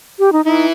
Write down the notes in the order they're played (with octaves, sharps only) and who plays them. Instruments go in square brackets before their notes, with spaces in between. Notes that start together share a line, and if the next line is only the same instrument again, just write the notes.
[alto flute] G4
D#4
[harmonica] E3 E4 [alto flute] D#4